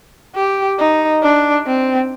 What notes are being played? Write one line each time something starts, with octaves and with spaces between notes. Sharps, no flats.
G4
D#4
D4
C4